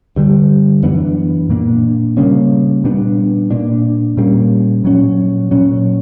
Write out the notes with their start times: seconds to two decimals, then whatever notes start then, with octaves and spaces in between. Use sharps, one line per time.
0.16 G2 D3 G3
0.83 F#2 E3 B3 D4
1.50 A#2 A#3 D4
2.17 C#3 G3 A#3 C#4
2.84 A#2 G3 B3 D4
3.51 A#2 A#3 D4
4.17 A#2 G3 A#3 C#4
4.84 A#2 F#3 C#4
5.51 A#2 F#3 C#4